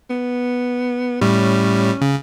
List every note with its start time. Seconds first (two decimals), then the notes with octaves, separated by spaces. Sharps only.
0.10 B3
1.21 A2 G3 C#4
2.02 C#3